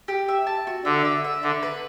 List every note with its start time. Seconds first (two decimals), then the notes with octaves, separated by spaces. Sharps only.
0.08 G4
0.28 E5
0.47 A5
0.67 F#4
0.85 D3 E5
1.05 E5
1.24 E5
1.43 D3 B4
1.63 B4